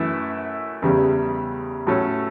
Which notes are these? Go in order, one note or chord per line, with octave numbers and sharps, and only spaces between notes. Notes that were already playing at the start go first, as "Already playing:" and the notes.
Already playing: F#2 E3 A3 E4
E2 C#3 G3
A2 F#3 A3 C#4